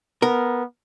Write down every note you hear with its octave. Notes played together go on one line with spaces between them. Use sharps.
B3 A#4